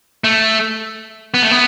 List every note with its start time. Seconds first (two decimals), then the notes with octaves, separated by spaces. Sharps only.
0.24 A3
1.34 B3
1.42 A3
1.51 B3